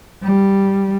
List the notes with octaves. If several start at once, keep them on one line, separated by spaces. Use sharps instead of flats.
G3